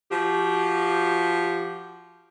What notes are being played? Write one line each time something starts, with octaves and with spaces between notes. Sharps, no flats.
F3 F#4 G4